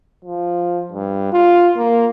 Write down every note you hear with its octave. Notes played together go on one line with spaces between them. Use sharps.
F3
G2
F4
A#3